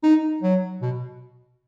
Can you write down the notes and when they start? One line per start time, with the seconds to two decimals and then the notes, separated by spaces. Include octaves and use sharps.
0.03 D#4
0.43 F#3
0.82 B2